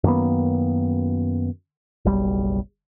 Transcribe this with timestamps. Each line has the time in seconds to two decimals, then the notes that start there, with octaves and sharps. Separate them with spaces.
0.04 F#2 D#3 A#3 B3
2.05 F#1 B1 G3